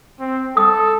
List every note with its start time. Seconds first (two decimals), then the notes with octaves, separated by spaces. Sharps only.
0.20 C4
0.57 A4 D#6